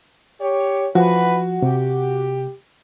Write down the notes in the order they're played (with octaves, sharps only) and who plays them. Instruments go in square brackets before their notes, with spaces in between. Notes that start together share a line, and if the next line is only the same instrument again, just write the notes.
[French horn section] G4 C#5
[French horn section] E3 B4 [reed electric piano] F3 [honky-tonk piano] F#4
[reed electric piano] C3 [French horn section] G4